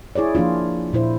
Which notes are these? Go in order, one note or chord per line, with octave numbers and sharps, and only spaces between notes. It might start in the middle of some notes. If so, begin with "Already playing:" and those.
E4 G#4 C#5 D5
F3 A#3 D4 F4
A#2 E4 C5